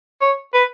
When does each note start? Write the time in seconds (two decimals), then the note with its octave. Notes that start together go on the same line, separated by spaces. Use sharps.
0.21 C#5
0.54 B4